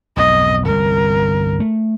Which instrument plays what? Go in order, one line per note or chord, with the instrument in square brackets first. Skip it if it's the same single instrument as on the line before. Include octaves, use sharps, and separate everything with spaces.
[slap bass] B1 F2 G#2 [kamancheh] D#5
[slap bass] G1 C2 [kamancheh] A#4
[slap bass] A3